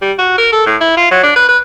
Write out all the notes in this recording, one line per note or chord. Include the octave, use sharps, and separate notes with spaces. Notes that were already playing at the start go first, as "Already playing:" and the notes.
G3
F#4
A#4
A4
A2
E4
F4
F#3
D4
B4
B4